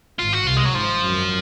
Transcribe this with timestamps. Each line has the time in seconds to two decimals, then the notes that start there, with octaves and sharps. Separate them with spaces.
0.19 G#1 G#2 F4
0.33 F#4
0.47 C2 C3 F4
0.56 G#3
0.65 F#3
0.75 G#1 G#2 F3
1.03 F#2